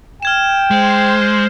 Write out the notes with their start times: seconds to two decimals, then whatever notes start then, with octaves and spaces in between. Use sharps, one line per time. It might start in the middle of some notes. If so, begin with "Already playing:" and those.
0.23 G5 F6 G#6 E7
0.71 G#3 C5